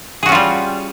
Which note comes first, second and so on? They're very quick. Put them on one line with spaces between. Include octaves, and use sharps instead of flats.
G#4 F#4 C#4 F4 G3